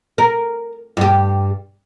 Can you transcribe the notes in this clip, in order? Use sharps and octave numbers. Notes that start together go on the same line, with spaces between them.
A#4
G2 G4